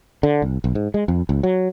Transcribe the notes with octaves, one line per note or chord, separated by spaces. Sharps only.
D3
C2
B1
G#2
G#3
F2
C#2
F#3